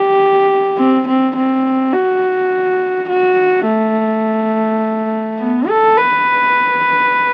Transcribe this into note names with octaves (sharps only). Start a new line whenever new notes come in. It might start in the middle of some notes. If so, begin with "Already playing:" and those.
Already playing: G4
C4
C4
C4
F#4
F#4
A3
B3
A4
B4